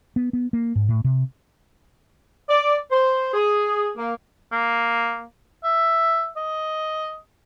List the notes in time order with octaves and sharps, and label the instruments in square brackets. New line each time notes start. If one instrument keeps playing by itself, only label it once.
[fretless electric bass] B3
B3
A#3
G#2
A2
C3
[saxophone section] D5
C5
G#4
A#3
[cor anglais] A#3
E5
D#5